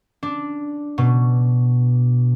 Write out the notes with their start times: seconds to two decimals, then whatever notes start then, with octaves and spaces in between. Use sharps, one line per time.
0.23 D4
0.98 B2